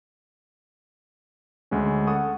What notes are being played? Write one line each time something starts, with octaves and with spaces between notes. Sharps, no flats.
D2 G#3 C#4
A4 F#5 C#6 D#6